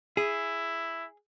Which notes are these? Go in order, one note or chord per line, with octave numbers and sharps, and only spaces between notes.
E4 G#4